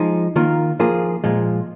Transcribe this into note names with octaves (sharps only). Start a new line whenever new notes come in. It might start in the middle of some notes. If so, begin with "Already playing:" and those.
Already playing: F3 G#3 D#4
D#3 A#3 F4 A#4
F3 A#3 F4 G#4
A#2 F3 G#3 F4